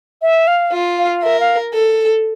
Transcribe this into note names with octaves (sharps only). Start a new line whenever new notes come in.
E5
F5
F4
F5
A#4 E5
F5
A4